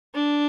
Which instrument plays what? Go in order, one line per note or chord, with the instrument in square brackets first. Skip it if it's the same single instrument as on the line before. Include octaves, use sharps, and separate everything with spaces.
[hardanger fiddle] D4